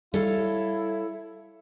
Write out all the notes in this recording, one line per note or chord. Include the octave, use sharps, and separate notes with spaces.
G3 E4 A4 C#5 F5